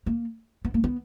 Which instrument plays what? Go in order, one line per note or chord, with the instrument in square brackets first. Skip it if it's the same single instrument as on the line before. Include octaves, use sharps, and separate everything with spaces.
[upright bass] A#3
B3
A#3
B3